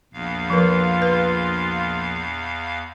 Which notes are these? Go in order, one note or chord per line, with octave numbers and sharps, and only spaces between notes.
A#1 E2 F5
F3 F4 A#4 B4
B4